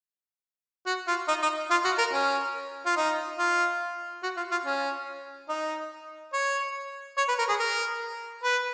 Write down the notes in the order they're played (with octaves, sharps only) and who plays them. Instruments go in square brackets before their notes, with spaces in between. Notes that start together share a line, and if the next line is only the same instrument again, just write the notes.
[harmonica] F#4
F4
D#4
D#4
F4
F#4
A#4
C#4
F4
D#4
F4
F#4
F4
F4
C#4
D#4
C#5
C#5
B4
A#4
G#4
A#4
B4